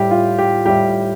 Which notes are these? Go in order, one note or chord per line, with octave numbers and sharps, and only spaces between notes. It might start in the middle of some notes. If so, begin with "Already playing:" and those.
Already playing: A2 G3 G4
F4
G4
A2 G3 G4